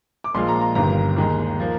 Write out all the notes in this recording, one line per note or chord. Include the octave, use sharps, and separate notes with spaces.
D6
A#1 A#2 F3 G#3 C6
A#5
A#5
G1 G2 D#3 A#5
D#2 D#3 G#3
F3 A#3